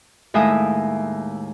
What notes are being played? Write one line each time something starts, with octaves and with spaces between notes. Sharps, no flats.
D#2 A2 G#3 E5 G#5 D#6